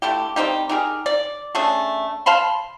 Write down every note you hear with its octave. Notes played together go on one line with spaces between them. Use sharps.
D3 A3 E4 G4
G3 C4 D#4 G4
D#4 G4 G#4 A#4
D5
A3 C#4 D4 G#4
F5 A5 B5 C6